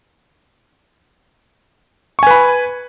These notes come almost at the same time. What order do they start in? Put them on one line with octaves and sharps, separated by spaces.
C#6 G#5 B4 B5